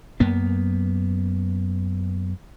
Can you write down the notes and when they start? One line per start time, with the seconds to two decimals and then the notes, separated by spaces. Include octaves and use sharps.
0.20 F#2 A#3 B3